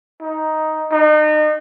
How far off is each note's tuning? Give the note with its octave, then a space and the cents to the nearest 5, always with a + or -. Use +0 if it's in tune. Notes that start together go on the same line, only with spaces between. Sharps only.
D#4 +5
D#4 -35